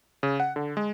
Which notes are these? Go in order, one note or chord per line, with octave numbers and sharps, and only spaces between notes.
C#3
F#5
D3
G#3